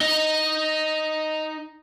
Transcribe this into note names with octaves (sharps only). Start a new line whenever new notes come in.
D#4 D#5